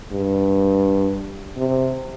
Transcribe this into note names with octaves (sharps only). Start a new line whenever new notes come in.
G2
C3